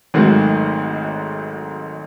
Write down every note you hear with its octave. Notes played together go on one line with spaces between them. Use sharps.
G#1 G#2 D#3 F#3 A3 F#4